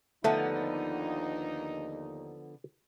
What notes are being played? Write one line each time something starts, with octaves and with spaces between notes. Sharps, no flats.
D#2 D3 F3 A3 B3 D#4